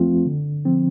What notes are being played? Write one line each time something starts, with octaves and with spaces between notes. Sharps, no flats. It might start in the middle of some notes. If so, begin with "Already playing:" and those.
Already playing: F2 F3 A3 C4 F4
D3
F3 C4